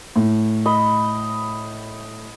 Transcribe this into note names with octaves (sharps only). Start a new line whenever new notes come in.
A2
D#5 B5